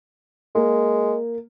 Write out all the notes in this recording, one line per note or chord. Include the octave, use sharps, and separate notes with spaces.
G#3 A#3